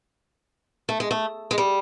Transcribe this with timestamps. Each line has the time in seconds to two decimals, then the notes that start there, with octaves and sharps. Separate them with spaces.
0.89 A3
1.00 G#3
1.11 A3
1.51 G#3
1.58 G3